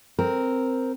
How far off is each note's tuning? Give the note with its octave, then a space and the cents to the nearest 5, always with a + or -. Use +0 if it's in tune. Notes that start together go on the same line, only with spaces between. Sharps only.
C4 +0 A#4 +0